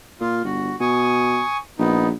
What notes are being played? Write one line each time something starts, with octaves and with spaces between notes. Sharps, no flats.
A#2 F4
G1 F#4
B2 G#5 C#6 D#6
A#1 B3 D#4